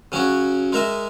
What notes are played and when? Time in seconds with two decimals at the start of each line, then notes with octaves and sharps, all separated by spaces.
0.12 C#3 F#3 C#4 F#4
0.72 G#3 D#4 A#4 E5